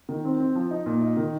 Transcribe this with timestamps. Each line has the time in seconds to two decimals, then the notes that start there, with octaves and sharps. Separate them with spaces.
0.09 D#3
0.25 C4
0.40 C4
0.55 F3
0.71 D#4
0.86 A#2
1.02 D#4
1.17 D#3